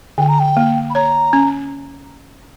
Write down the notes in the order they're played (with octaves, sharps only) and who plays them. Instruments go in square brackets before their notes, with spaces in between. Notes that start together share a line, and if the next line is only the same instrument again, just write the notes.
[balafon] D3 [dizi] G5
[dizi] A#5
G5
[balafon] A#3
[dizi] B5
[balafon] C#5 [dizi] A#5
[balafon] C#4